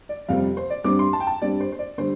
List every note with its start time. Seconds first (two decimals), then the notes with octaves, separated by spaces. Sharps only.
0.09 D5
0.29 F2 C3 G3 C4 F5
0.57 C5
0.70 D5
0.84 G2 G3 C4 D6
0.99 C6
1.13 A5
1.20 G5
1.27 A5
1.42 G2 G3 C4 D5
1.60 C5
1.72 C5
1.79 D5
1.98 D3 G3 C5